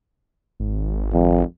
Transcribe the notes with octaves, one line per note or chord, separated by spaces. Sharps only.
G#1
F2